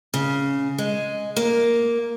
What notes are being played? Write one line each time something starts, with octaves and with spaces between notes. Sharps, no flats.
C#3
G#3
A#3